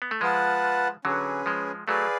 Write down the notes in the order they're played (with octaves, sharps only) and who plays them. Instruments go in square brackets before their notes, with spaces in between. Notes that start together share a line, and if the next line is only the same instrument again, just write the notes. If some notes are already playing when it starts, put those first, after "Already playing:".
[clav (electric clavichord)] B3
A3
[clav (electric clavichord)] F3 G#3 [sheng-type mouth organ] F4 B4 F#5 A5
[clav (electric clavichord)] D3 F#3 [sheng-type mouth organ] C#4 G#4 B4
[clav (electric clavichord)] F3 G#3
[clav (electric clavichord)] F#3 A3 [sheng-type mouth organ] G#4 B4 D5 F5